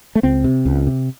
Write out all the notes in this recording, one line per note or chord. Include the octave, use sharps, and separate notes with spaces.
A3
C#2 C4
C3
C#2
C3